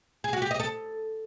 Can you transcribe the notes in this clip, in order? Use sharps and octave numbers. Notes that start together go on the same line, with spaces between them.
G#4
F#4
G4
D#5
A4